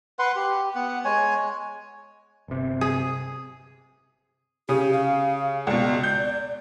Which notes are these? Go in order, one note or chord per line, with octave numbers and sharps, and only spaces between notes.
B4 F#5 C6
G4
B3 F#5
G#3 C#5 G#5
G1 C3
G#4
C#3 G4 D#6
F5
C#2 B2 D5
G6